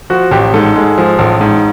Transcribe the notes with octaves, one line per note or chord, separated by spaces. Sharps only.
F3 F#4
A1 G4
G#2 A4
G#3
F3
A1
G#2